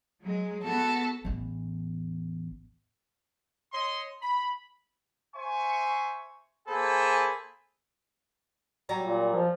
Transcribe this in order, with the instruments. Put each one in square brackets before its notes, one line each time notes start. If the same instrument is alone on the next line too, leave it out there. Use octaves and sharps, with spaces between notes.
[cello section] F#3 G#3
[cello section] B3 F#4 [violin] A4
[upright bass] A1 E2
[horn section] C#5 D#5 C6
B5
[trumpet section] C5 E5 G#5 C#6
A#3 G#4 A4 C5 G#5 B5
[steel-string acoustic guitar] F#3 G3 A#5
[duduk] A#2
F3